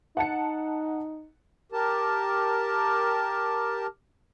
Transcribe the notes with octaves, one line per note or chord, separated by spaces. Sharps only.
D#4 F#5 A5 C#7
G4 A#4 A5